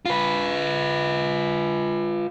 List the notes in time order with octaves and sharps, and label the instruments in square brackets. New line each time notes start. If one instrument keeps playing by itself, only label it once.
[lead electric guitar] F4 B4